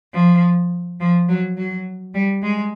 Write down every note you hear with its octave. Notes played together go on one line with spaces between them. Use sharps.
F3
F3
F#3
F#3
G3
G#3